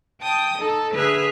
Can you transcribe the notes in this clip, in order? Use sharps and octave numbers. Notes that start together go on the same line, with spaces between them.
G5 A5 D#6 G6
D#4 A4
D3 G#4 B4 E5 F6 F#6